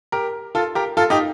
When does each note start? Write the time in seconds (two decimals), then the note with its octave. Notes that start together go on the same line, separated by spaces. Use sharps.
0.12 G4 A#4
0.55 F4 A4
0.75 G4 A#4
0.97 F4 A4
1.10 D#4 G4